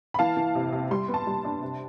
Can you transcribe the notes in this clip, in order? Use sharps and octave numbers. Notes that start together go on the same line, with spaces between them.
B5
E3 F5 A5
E3
C3
C3
G3 C6
B3
A5 C6
G3
D4
C3